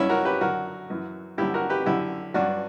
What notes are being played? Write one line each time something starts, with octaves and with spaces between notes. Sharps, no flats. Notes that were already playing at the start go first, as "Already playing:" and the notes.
Already playing: G2 F#3 C#4 E4
F#4 A#4
G4 B4
F#2 D3 F#3 F#4 A#4
F#2 E3
G2 D3 F#3 E4 G4
F#4 A#4
G4 B4
F#2 D3 F#3 E4 G4
G2 F#3 D4 F#4